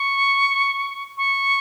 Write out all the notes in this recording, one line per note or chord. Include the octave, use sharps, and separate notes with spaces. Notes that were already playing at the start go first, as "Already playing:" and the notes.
Already playing: C#6
C#6